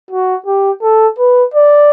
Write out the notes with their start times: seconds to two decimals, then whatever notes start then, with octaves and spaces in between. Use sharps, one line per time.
0.11 F#4
0.46 G4
0.82 A4
1.19 B4
1.54 D5